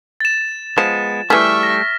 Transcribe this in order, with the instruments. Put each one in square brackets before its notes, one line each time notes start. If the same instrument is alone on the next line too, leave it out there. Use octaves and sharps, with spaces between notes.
[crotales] A6 E7
[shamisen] F3 [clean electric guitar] G#3 B3 [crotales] E7
[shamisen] E3 G#4 [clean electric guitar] G3 A3 [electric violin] E5 C#6 [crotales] F6 B6
[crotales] A#6